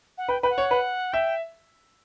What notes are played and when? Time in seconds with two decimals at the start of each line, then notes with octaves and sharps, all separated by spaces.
0.18 F#5
0.28 B4 G5
0.43 B4 G5
0.50 F#5
0.58 C#5
0.71 B4
1.13 E5 G5